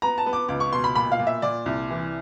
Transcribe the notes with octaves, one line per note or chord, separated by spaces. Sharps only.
B3 A#5
A5
B3
D6
C#2 D6
C#6
B2 C6
B5
A#2 B5
F5
A#2
E5
A#2 D5
C2
E3